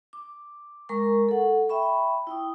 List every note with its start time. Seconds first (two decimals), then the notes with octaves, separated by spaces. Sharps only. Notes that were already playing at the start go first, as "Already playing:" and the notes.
0.13 D6
0.89 G#3 A#4 A#5 C#6
1.29 A4 F#5
1.69 E5 G5 B5 C#6
2.27 E4 G5 D#6